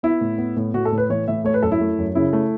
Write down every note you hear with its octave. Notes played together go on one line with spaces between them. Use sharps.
B3 E4
A2
B3
A2
A2 F#4
A4
A2
B4
E3 C#5
A2 E5
A3 C#5
B4
F#2 A4
E4
A3
F#2
C#3 E4
A3